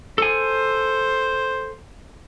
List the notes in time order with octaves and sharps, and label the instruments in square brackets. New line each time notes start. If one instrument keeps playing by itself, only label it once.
[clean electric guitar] A4 G#5 [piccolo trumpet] C5